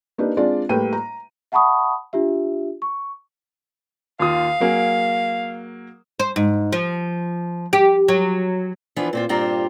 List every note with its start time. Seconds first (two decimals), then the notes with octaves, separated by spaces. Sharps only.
0.18 A#3 D4 D#4 G4 B4
0.37 G#3 C4 D4 F4 D5
0.69 A2 G3 A#3 B4 G5 D#7
0.93 A#5
1.52 E5 F#5 A5 B5 C#6 D#6
2.13 D4 F4 G4 E5
2.82 C#6
4.20 D#2 F4 F5 D#6
4.60 F#3 A#3 G#4
6.20 C5
6.36 G#2
6.73 F3
7.73 G4
8.08 F#3
8.96 E3 F3 B3 D4 B4
9.13 A#2 C4 F4
9.29 G2 A#2 C4 F4 G4 A#5